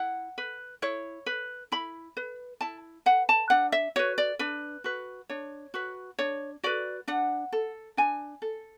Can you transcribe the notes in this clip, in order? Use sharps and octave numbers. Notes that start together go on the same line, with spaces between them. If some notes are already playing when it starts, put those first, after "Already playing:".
Already playing: E4 F#5
B4
E4 C#5
B4
E4 B5
B4
E4 A5
B4 F#5
A5
D4 F#5
E5
F#4 B4 C#5
D5
D4 B4
F#4 B4
D4 C#5
F#4 B4
D4 C#5
F#4 B4 D5
D4 F#5
A4
D4 G#5
A4